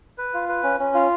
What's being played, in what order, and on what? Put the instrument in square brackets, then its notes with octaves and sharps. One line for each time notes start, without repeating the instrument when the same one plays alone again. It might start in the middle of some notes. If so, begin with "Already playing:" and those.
[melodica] B4
F4
B4
C#4
C#4
F4